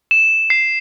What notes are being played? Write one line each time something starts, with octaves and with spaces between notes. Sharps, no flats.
E7
C7